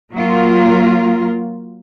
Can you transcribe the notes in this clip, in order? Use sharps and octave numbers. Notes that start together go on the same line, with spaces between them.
F#3 A#3 F4 A#4